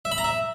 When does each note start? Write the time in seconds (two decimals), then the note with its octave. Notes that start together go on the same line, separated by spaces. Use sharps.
0.05 E5
0.12 B5
0.18 A#5
0.24 E5